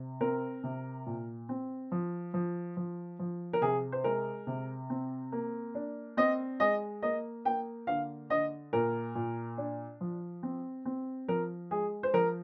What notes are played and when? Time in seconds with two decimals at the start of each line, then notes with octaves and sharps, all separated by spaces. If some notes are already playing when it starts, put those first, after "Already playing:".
Already playing: C3
0.21 C4 A#4
0.63 C3
1.06 A#2
1.49 C4
1.92 F3
2.34 F3
2.77 F3
3.19 F3
3.53 A#4
3.61 C3 G#4
3.92 C5
4.04 G#3 A#4
4.47 C3
4.90 C4
5.32 A#3
5.75 D4
6.17 C4 D#5
6.60 G#3 D#5
7.02 A#3 D#5
7.45 A#3 G5
7.87 D3 F5
8.30 D3 D#5
8.73 A#2 A#4
9.15 A#2
9.58 D4
10.01 F3
10.43 C4
10.85 C4
11.28 F3 A#4
11.71 G#3 G#4
12.03 C5
12.13 F3 A#4